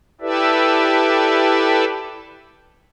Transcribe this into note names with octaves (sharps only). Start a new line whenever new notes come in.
E4 G4 A4 B4 D5 E5